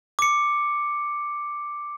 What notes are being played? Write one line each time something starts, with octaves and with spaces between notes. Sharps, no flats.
D6 C#7